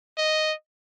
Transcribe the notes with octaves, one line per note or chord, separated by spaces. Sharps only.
D#5